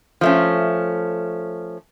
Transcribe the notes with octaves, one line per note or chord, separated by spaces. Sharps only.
F3 A3 C#4